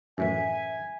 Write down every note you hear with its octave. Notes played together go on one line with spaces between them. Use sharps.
F#2 A2 E3 E5 G#5